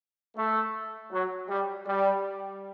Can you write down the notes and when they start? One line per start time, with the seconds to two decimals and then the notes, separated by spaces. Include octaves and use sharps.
0.37 A3
1.12 F#3
1.49 G3
1.87 G3